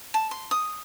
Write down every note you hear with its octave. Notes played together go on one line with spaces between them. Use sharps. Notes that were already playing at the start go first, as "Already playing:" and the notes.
A5
C6
D#6